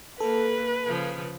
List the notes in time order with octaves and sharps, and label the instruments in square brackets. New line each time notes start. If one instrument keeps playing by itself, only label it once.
[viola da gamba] A#3 [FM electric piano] A4 [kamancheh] B4
[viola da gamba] C#3 F3